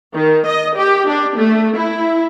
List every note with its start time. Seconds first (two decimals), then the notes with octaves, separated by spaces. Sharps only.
0.13 D#3
0.46 D#5
0.76 G4
1.08 D4
1.37 A3
1.76 E4